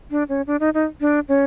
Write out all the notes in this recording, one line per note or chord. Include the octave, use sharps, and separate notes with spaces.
D4
C#4
D4
D#4
D#4
D4
C#4